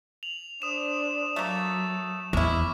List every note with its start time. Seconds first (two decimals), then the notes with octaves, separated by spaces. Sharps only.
0.23 F7 F#7
0.62 D4 C5 D#6 E7
1.36 F#3 A3 A#3
2.33 E2 G#3 E4 C#6 D6 F6